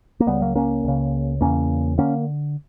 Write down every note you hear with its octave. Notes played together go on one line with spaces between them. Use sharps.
A#3
C#2 C#3 G3 B3
F#3 A#3
A#3 C#4
C#2 C#3
E2 C#3 A#3 C#4
D3 A#3 C#4